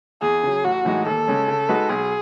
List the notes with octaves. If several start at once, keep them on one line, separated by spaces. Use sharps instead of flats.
E2 G#4
C#3 F#3
A1 F#4
A2 E3 G#3 D#4
D#2 A4
C#3 G#3 C#4
C#3
G#3 D#4 F#4 B4
B1 G#4